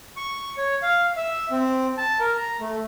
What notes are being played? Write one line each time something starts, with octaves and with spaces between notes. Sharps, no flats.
C#6
C#5
F5
E5
C4
A5
A#4
A#5
A3